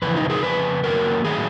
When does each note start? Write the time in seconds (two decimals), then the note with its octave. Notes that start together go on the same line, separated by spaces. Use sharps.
0.02 F2 C#3 E3 B4
0.15 D#4 F4
0.24 B4
0.30 G#4 A#4
0.43 F2 C#3 B4
0.83 F#2 D#3 F#3 A#3 A#4
1.25 D#3 F#3 G#4